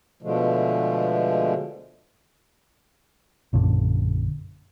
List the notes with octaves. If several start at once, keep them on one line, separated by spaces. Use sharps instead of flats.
B2 D3 F3 G#3 A3
A#1 F#2 A#2 D3